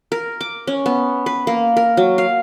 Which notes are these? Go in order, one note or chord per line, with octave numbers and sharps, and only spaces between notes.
A#4
D6
C#4
B3
B4
A#3
A#4
F#3
F5